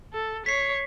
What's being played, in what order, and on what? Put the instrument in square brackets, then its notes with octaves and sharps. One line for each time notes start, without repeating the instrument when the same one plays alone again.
[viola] A4
[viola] C#5 [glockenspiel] B6 C7